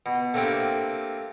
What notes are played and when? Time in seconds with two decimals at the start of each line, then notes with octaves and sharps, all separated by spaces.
0.06 B2
0.34 A3 A#3 C4 D4 G4